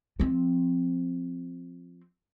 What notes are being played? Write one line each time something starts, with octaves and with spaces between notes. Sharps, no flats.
F3 C4